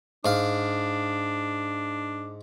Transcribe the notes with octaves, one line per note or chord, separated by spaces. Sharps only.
G#2 D4 F5